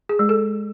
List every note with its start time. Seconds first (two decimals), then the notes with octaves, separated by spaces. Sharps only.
0.09 G#4
0.19 G#3
0.29 A4